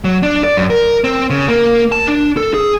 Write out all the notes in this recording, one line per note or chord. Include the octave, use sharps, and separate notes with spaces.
F#3
D4
D5
F#2
A#4
C4
C#3
A#3
A5
D4
A4
G#4